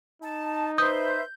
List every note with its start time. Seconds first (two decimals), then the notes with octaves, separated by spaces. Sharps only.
0.22 D#4 A5
0.78 B4 C5 E5 D#6 G6